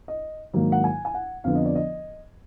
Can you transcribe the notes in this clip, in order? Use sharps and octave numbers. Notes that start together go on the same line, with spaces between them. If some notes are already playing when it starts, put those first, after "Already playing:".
D#5
G#2 D#3 F#3 A#3
F#5
G#5
G#5
F#5
F2 D3 F3 B3 F5
D#5
D5
D#5